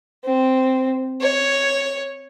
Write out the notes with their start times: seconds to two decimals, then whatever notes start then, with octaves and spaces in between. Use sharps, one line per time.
0.25 C4
1.21 C#5